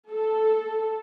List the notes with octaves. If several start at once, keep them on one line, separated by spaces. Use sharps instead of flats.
A4